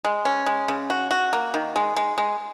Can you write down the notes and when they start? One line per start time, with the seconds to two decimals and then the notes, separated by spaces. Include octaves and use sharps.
0.05 G#3
0.25 C#4
0.46 G#3
0.68 C#3
0.90 F#4
1.11 F#4
1.33 A#3
1.54 D#3
1.76 G#3
1.96 G#3
2.18 G#3